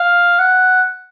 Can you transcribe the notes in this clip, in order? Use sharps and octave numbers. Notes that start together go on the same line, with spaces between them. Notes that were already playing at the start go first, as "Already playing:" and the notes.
Already playing: F5
F#5